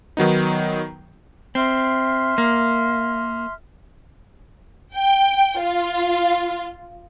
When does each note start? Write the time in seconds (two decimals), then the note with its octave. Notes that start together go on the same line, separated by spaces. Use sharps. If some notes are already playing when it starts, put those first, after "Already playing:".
0.17 D#3 F#3 B3 D#4
1.55 C4 E5 C6 F6
2.38 A#3
4.94 G5
5.60 F4